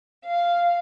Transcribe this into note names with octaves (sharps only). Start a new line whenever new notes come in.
F5